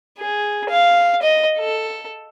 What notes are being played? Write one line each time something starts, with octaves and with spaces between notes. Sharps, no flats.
G#4
F5
D#5
A4